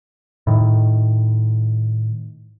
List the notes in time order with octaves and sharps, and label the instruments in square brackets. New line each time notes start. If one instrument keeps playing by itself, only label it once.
[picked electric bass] A2 D#3